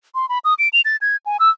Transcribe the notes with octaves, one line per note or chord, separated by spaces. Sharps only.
C6
B5
D#6
D7
F7
A6
G#6
G#5
E6